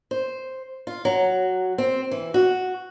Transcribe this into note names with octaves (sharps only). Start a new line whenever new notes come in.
C5
F4
F#3
C4
E3
F#4